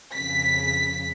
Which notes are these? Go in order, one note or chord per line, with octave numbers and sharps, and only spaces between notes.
F2 C#3 B6